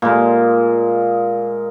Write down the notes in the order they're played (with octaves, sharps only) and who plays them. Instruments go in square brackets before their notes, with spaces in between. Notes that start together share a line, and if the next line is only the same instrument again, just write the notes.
[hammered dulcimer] A#2 G#3